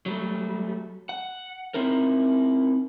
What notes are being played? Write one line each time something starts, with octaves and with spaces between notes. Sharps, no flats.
F#3 G3 A3
F#5
C4 D#4 E4 A#4